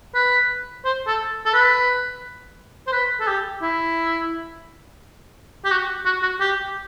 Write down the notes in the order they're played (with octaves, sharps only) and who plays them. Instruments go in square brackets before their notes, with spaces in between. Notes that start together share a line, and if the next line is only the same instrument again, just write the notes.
[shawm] B4
C5
A4
A4
B4
C5
B4
A4
G4
E4
G4
F#4
F#4
F#4
G4